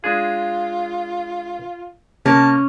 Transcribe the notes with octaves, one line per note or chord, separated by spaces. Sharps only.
G#3 D4 F4 G#4
C3 A#3 C#4 A#4 A5